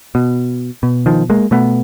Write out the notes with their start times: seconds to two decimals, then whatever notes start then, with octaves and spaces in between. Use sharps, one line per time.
0.15 B2
0.83 B2
1.06 D#3 F3
1.30 G#3 A#3
1.51 B2 A3 B3